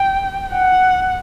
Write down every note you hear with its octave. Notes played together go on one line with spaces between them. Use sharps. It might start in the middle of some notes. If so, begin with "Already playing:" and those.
Already playing: G5
F#5